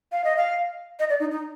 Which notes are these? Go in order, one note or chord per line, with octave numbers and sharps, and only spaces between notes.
F5
D#5
F5
D#5
D5
D#4
D#4